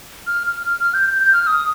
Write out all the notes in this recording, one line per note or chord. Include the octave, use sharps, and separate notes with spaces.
F6
F6
F6
F6
G6
G6
G6
F6
D#6